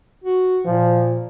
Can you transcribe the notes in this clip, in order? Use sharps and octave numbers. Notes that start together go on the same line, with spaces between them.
F#4
A#2 F3